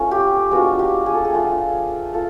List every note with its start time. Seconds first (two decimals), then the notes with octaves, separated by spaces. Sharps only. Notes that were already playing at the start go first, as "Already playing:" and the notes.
Already playing: A3 B3 C#4 F4
0.11 G4
0.51 G#3 B3 D4 F4 F#4
0.79 G4
1.06 G#4
1.14 A4
1.24 G#4
1.33 A3 D4 F4
2.14 F4 A4